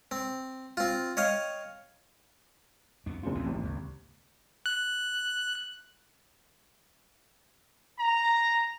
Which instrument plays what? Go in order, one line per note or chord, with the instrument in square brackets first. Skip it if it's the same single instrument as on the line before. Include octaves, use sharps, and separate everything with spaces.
[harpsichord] C4
C4 F4
C#5 D#5 F5 G5
[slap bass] F2 B3 D4
[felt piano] F#1 F2 F4 [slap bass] A3
[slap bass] A1 D2 E3
[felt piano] G#1 D#2
[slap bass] D2 C#3
[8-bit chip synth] F#6
[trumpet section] A#5